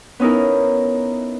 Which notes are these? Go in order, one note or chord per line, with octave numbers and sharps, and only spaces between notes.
B3 C#4 D#4 E4 A#4